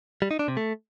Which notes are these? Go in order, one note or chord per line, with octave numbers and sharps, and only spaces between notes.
G3
D#4
D4
C3
A3